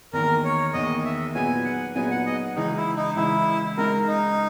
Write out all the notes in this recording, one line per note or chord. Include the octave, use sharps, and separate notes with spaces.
E2 D#3 A#3 A#4
C#5
E2 D#3 A#3 D#5
E5
A#2 F#3 B3 D#4 G#4 G#5
F#5
A#2 F#3 B3 D#4 G#4 G#5
F#5
D#5
C#2 C#3 E3 D#4
E4
D#4
C#2 C#3 E3 E4
C#2 C#3 G#3 D#4 A#4
D#4